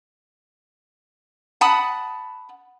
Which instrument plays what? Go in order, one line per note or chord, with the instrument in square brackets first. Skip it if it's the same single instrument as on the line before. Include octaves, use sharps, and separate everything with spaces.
[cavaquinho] F#5 A5 B5 D#6